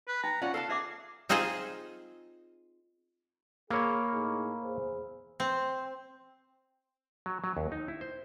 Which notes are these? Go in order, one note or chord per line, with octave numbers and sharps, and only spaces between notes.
B4
D#4 G5 A#5
C#4 F4 D5 F#5
A4 F5 F#5 A5
D#4 G#4 E5 D6
C4 D#4 F4 G#4 C5 D#5
A#3 G#4 C#5 B5 E6 F6
A2 D#4 G#4
E2 G#4 C5
C4
F#3
F#3
D#2
D#4
E4
C5